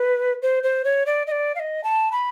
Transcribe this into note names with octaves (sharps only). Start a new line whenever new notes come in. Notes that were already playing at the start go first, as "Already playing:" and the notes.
Already playing: B4
C5
C5
C#5
D5
D#5
D5
F5
D#5
A5
B5